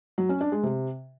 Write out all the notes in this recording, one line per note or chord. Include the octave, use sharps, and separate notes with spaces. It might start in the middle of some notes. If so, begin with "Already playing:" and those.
F#3
C#4
D4
G#3
C3